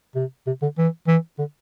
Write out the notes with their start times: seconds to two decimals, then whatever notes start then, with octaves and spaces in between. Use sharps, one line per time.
0.15 C3
0.47 C3
0.62 D3
0.78 E3
1.08 E3
1.39 D3